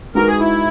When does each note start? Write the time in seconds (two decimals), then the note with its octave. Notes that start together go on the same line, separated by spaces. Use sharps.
0.15 G#3 D#4 F#4 A#4 B4
0.28 G#4
0.40 E4